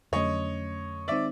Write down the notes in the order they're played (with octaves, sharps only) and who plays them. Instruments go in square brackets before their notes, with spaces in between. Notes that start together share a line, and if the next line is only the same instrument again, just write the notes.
[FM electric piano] F2 D3 F#3 A3 C#4 [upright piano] C#5 D#5
[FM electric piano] D#3 G#3 C4 D#4 [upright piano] D5 E5